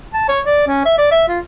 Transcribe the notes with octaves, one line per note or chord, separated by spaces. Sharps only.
A5
C#5
D5
C#4
E5
D5
E5
F4